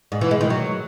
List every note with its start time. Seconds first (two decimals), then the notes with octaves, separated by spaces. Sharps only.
0.12 G#2
0.21 E3
0.31 G#3
0.41 D#3
0.50 F#3